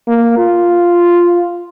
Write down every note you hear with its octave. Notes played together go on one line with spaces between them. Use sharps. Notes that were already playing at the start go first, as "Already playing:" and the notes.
A#3
F4